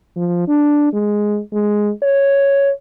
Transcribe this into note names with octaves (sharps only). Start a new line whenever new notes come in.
F3
D4
G#3
G#3
C#5